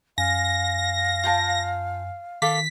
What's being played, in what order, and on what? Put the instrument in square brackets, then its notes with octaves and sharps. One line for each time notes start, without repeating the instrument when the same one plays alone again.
[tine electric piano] F#2 G#5 [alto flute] F5 [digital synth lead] A#6
[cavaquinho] F4 G5 A5
[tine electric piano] D#3 [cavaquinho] A4 F5 D6 [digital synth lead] B6